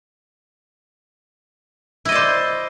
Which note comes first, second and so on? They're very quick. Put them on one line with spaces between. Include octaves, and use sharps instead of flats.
E4 D#5 D5 C5